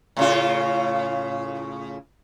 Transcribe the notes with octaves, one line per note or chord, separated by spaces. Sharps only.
A2 C#3 F4